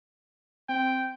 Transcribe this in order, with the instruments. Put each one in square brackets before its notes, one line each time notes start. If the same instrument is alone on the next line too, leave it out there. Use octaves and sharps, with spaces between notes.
[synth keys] C4 [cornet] G5